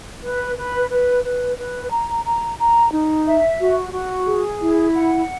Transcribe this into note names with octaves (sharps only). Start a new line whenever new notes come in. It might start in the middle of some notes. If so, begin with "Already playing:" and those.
B4
B4
B4
B4
B4
A#5
A#5
A#5
D#4
E5
F#4
F#4
G#4
E4
F#5